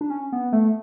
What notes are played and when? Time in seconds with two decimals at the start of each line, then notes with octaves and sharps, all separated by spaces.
0.01 D4
0.10 C#4
0.33 B3
0.53 A3